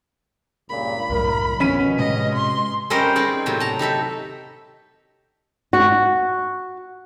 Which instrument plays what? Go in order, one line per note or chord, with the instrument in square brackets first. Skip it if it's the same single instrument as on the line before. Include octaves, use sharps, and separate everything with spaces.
[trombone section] C#2 G2 A#2 [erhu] B5
[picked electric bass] C2 F#2 A2 [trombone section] A#4
[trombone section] B2 [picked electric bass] D#3 F3 [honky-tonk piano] C#4 B6 D#7
[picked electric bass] A2 C3 G#3 [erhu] D#5
[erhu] C6
[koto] G3 C4 C#4 A#4 C5 D#5
C4 D#4 G#4 D5
A2 C3 F#3 B3
A5 A#5
D#4 G4 A4 E5
[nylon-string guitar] F#4